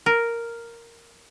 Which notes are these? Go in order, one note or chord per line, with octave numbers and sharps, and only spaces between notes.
A#4